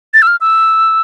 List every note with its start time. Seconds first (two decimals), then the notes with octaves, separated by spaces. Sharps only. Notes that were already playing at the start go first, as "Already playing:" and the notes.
0.14 A6
0.22 E6
0.27 F6
0.41 E6